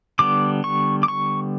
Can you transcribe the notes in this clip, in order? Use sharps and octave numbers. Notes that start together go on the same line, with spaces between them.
D3 G3 B3 D6
C#6
D6
C#6